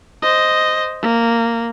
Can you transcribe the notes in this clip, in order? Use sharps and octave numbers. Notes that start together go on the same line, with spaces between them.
C5 D#5
A#3